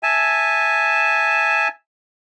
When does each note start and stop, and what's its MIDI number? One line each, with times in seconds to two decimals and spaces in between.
0.03 1.68 76
0.03 1.68 80
0.03 1.68 81